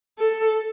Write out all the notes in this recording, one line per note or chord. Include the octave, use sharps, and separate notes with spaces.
A4